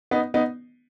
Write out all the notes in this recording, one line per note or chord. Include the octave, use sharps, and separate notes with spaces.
B3 D#4
B3 D#4